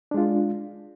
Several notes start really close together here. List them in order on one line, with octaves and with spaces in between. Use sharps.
D4 G#3 F4